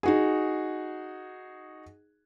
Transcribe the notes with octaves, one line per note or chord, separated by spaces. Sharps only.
D#4 F#4 G#4